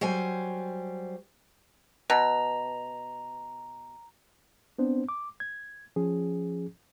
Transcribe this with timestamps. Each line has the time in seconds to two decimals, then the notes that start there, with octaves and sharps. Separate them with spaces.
0.01 F#3 G3 C5 G#5
2.10 B2 A#5
4.79 B3 C4 D4 C5
5.09 D6
5.40 G#6
5.96 F3 C#4 G#4